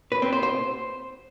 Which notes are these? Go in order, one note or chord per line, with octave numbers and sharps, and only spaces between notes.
B4
C4
C5
C5